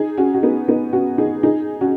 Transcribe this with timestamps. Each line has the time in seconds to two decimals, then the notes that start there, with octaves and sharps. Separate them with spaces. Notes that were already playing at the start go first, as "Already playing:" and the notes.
Already playing: D#4 G#4
0.18 C#4 F#4
0.34 F#4
0.43 B3 D#4
0.68 B3 D#4
0.93 C#4 F#4
1.18 D#4 G#4
1.43 D#4 G#4
1.81 C#4 F#4